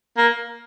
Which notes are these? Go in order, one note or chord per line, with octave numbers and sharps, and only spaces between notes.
A#3